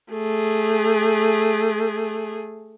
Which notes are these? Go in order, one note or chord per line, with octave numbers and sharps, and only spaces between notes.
A3 G#4